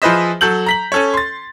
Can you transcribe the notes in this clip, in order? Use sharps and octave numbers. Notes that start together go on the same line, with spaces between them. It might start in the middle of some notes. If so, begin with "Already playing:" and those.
F3 G#4 B4 C5 D#5 E5
F#3 A4 G6 F#7
A#5 B6 F#7
C#4 A4 C#5
C6 A6